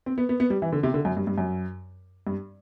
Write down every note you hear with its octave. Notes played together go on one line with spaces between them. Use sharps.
C4
B3
B3
B3
G3
E3
D3
C3
D3
F#2
G2
G2
F#2
G2